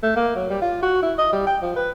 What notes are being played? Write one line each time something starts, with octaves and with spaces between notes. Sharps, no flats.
A3
A#3
F#3
G3
F4
F#4
E4
D#5
G3
G5
F3
B4